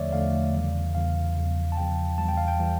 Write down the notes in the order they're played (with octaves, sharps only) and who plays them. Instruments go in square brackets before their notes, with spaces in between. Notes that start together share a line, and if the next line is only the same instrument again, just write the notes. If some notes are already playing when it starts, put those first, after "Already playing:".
Already playing: [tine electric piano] E2 D3 F3 A3 C#5 D5 E5
E2 D3 F3 A3 F5
E2 C#3 E3 G3
E2 C#3 E3 G3 F5
E2 C#3 F3
A5
E2 C#3 F3 G5
E2 E3 G3 A5
G5
F5
G5
E3 G3